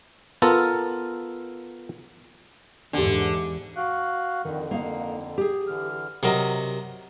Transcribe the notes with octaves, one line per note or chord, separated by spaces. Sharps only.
B3 F4 A4 A#4
E2 G#2 D3 D4 G4
F#4 F5 F#6
F2 D3 D#3
A#3 D#4 F5
G4 G#4
D3 E3 F6
C3 F#3 A#4 D#5